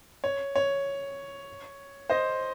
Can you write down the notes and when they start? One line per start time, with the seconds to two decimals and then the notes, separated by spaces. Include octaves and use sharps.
0.24 C#5
0.56 C#5
2.10 C5 D#5